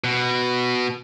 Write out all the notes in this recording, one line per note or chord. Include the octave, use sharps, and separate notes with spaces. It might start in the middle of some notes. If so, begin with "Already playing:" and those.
B2